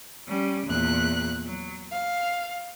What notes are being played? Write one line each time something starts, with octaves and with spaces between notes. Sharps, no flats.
G3 C#4
E2 A#2 F#6
F#3
F5